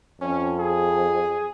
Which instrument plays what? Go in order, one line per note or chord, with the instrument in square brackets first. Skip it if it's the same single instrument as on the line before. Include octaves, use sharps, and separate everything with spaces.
[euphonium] F2 [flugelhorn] C#4
[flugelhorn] G#4